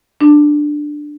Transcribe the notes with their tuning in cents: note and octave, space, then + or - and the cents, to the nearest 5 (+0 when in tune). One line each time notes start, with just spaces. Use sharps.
D4 +10